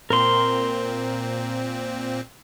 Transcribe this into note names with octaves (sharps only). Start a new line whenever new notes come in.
A#2 C4 A#4 C6